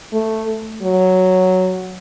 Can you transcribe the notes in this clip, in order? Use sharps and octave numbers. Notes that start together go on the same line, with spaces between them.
A3
F#3